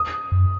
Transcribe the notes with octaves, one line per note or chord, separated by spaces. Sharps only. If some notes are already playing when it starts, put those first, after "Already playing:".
Already playing: D#6
F#2